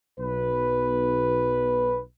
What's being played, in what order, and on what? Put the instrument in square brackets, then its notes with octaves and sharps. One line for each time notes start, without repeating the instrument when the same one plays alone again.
[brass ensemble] B1 B4